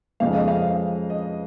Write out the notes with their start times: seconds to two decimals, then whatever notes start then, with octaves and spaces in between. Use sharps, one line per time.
0.20 F2 C#3 G#3 F5
0.34 D#5
0.48 F5
1.10 D#5